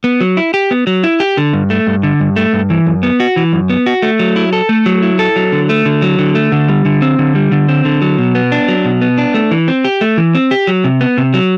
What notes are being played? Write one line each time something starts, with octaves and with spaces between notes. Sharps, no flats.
B3
F#3
E4
G4
B3
F#3
E4
G4
D3
G2
A3
G2
D3
G2
A3
G2
E3
F#2
B3
F#4
E3
F#2
B3
F#4
A3
F#3
E4
A4
A3
F#3
E4
A4
F#3
D3
A3
D3
F#3
D3
A3
D3
G3
D3
C4
D3
G3
D3
C4
D3
F#3
B2
B3
D4
F#3
B2
B3
D4
A3
E3
C4
G4
A3
E3
C4
G4
F#3
C3
B3
C3
F#3